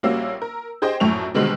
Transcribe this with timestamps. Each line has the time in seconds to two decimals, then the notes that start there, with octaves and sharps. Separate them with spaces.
0.03 A#1 G3 A#3 C#4 F#4 E6
0.42 A#4
0.82 G4 G#4 C5 D#5 G5
1.00 A#1 F#2 A2 A3 C#6 F7
1.34 B2 D3 D#3 G3 G#3 C4